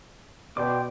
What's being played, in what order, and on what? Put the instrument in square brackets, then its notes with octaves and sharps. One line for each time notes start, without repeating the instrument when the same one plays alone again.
[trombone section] B2 [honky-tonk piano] D5 [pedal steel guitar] G5 C6 D6